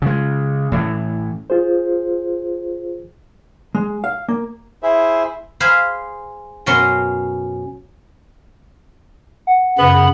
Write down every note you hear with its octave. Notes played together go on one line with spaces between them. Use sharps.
C#3 G#3
A2 E3
F4 G#4 C5
G#3
F5
A#3
E4 G#4 C5 E5
G#4 C5 F5 G#5 B5
F#2 B2 C#4 A#4 C6
F#5
F#2 C#3 B3 B5